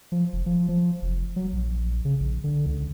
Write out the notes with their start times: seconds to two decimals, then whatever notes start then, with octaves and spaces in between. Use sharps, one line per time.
0.12 F3
0.33 F1
0.46 F3
0.69 F3
1.02 F1
1.36 F#3
1.53 A#1
2.05 C#3
2.20 A#1
2.44 D3
2.66 C#2